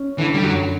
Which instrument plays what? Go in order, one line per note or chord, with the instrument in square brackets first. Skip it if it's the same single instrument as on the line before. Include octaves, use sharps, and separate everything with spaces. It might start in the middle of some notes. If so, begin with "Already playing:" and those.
Already playing: [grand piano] C#4
[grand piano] D3 [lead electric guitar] E3
[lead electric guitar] G3
[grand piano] F#2 [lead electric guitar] F#3